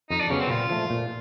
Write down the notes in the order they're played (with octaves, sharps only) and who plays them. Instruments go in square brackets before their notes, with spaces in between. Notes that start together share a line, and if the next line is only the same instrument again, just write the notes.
[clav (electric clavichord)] F2 [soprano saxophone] D#4
[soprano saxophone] D4
[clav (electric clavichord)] C#3 F#3 B3 [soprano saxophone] C#4
[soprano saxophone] C4
[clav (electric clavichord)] A#2 [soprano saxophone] F4
[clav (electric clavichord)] F3 A3
A#2